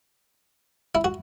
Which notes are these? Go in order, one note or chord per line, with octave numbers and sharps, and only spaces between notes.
E4
F#4